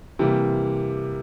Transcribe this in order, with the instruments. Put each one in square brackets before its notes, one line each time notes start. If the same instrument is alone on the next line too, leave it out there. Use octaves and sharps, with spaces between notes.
[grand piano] C3 E3 G3 A#3